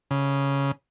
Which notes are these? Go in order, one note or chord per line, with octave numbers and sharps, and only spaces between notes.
C#3